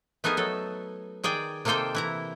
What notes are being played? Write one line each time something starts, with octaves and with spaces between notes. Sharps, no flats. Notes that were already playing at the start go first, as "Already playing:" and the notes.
A3 B3 D#4 G#4 A#4
F#3 A4
D#3 G#4 D5 G5
C3 A#3 D#4 A4 C5 G5
E3 E4 A#5